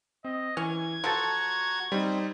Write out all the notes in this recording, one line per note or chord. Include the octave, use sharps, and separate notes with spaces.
C4 D#5
E3 C#4 G#6
F3 F#4 A4 A#5 C6 C#6 A6
G3 C4 D#4